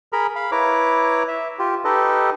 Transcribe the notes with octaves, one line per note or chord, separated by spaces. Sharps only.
G#4 A#4 A#5 B5
F5 B5
E4 B4 C#5 A#5 D6
E5
F4 G4
D#4 G4 A4 B4 D#5